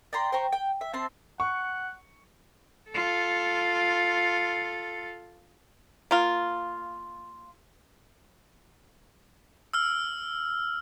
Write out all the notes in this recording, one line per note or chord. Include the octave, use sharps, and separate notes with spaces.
D5 G5 A#5 C6
C5 G5 A#5 C#6
G5
E5
C4 E5 A5 C6
F#5 C#6
F4 A4
A#3 F4
E6 F6